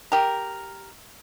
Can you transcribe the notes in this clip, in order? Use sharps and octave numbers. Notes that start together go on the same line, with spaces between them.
G4 A#4